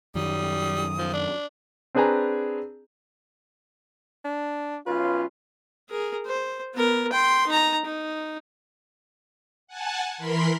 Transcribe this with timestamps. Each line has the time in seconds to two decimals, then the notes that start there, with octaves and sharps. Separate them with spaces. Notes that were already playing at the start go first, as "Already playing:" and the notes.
0.15 F#2 D#3 F#3 G3 D#6
0.98 F3
1.13 D4
1.95 C4 D4 G#4 B4 G#5 A#5
4.24 D4
4.86 B1 C#4 F4 B4
5.90 G#4 A#4
6.26 C5
6.74 B3 A#4
7.13 G5 C6
7.47 D#4 A#5
7.85 D#4
9.67 F#5 G#5 A5
10.18 E3 A#4 B5 C6 B6